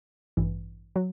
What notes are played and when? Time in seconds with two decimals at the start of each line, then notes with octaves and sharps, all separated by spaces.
0.37 A1 G2 E3
0.96 F#3